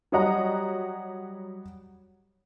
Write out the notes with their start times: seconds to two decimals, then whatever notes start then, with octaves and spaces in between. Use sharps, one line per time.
0.12 F#3 G3 C#5 D#5 F#5 A#5